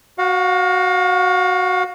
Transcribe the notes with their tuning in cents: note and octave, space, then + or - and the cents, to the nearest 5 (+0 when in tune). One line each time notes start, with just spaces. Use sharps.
F#4 +0 F5 +35